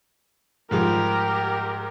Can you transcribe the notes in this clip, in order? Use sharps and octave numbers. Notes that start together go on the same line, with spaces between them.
G#2 F3 G3 G4 A#4